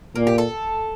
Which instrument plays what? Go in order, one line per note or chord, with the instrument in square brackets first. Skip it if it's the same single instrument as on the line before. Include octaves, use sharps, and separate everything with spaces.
[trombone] A#2 [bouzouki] A#3
[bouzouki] G4
A4